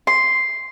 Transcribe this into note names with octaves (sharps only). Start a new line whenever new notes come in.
C6